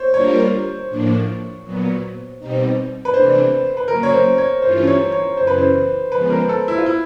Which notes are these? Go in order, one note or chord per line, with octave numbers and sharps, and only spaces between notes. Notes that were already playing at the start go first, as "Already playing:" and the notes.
Already playing: C5 C#5
G3 A#3 D4 F4 A#4 C#5
A2 F3 A#3 D4
A#2 F#3 B3
B2 G3 C4 D#4
B4
C3 E3 A3 D4 C5
B4
C#3 F#3 A#3 A#4
C#5
C5
C#5
G2 E3 A3 C#4 F4 C5
C#5
C#5
F#2 C#3 E3 C5
B4
C5
C#3 F3 G#3 B3 B4
A#4
A4
E4
F4
E4